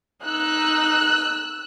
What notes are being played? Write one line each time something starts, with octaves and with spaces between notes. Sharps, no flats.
D#4 E6 F#6